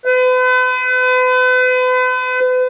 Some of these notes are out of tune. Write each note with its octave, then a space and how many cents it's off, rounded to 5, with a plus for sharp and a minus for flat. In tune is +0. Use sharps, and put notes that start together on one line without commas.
B4 +40